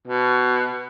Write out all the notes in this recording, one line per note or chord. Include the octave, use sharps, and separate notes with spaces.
B2